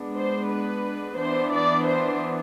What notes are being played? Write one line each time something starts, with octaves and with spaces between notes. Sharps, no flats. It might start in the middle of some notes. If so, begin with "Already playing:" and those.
Already playing: G#3 B3 D4
C5
B4
E3 B3 D4 C5
D5
C5